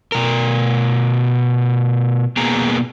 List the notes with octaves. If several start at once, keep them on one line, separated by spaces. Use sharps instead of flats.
B2 A#4
B2 A#3 B3 G#4 A#5